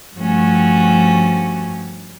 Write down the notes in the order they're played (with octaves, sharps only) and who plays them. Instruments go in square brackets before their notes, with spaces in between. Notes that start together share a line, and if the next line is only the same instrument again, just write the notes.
[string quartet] G2 F3 G3 A3 C#4 F#4